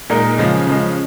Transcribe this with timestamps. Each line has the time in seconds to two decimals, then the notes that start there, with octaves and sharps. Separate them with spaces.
0.10 A#2 G#3 D#4 A#4
0.38 C#3 F3 G#3
0.67 C#3 F3 G#3